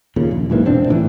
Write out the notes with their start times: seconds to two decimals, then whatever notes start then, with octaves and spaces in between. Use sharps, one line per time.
0.16 D#2 A#2 C#3
0.31 A#1
0.50 B1 G#2 E3 A#3
0.65 E1 C4 D4
0.88 A1 A2 D#3 E3